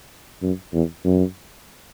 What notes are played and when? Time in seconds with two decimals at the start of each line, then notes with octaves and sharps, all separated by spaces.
0.42 F#2
0.74 E2
1.04 F#2